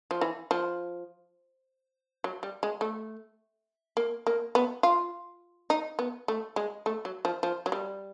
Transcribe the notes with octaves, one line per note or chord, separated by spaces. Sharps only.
F3
E3
F3
F#3
G3
G#3
A3
A#3
A#3
B3
F4
D#4
B3
A3
G#3
A3
F#3
F3
F3
F#3
G3